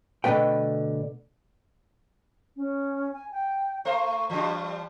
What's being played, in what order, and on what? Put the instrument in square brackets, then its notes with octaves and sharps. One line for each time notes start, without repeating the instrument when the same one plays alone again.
[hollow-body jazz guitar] B2 D3 D#3 A3 B4 G5
[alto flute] C#4
G#5
G5
[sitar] A3 C5 [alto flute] C#6
[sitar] E3 G3 D4